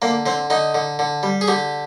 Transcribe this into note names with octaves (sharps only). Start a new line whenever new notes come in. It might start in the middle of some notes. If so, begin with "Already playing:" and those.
D3 A#3
D3 C4
D3 D#4
D3
D3
G3
G#4
D3 G4